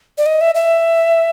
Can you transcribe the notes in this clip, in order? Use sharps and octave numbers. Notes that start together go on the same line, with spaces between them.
D5
D#5
E5
E5